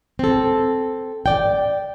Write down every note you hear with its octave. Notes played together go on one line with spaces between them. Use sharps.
C4 A4
D5 G5